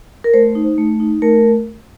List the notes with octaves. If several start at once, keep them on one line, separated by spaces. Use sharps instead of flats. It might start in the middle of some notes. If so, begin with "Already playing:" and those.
A#4
A3 C5
D#4
A3
D#4
A3 A#4